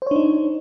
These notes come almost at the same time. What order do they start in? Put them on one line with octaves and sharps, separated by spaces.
C5 C#5 D4 D#4